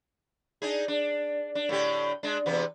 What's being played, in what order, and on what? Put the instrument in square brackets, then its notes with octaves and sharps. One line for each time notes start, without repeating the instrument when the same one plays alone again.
[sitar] D4 D#4 G#4
D4
D4
A2 D3 G4
G#3 D4
E2 C3 B3